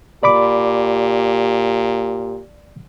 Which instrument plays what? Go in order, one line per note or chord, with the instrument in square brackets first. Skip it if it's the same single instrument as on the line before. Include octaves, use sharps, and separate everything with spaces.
[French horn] A#2 [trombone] G4 [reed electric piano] D5 B5 D6